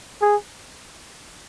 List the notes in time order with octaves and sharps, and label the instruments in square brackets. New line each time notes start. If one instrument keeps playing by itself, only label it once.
[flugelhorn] G#4